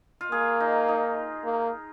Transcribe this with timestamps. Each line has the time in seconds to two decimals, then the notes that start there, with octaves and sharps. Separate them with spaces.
0.21 F4
0.32 A#3 G#4
0.60 D#4
0.89 D#4
1.45 A#3